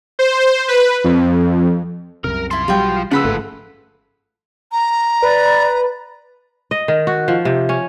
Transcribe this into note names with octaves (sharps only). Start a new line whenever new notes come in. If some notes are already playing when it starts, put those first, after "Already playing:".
C5
B4
F2
C2 F#2 C3 A#4
F3 E4 A5 C6
B1 F#3 G3 F4 F#4 G5
C#3 F3 B4 F#5 B5 C6 E6
G1 G#2 A3
A#5
B4 D5
D#5
D#3
F#4
F3
C3
C#4